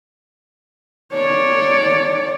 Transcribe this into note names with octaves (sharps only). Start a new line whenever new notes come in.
C#5 D5